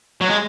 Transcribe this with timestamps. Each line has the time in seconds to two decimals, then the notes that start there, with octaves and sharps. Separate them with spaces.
0.21 F#3
0.28 G#3